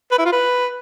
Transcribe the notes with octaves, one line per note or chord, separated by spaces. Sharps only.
B4
E4
F4
B4